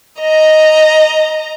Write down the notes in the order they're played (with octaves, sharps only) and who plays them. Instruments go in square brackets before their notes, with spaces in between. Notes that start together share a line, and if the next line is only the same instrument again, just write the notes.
[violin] D#5 A#5